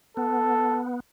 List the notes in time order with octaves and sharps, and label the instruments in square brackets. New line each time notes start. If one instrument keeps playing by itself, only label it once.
[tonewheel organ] B3 [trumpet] A4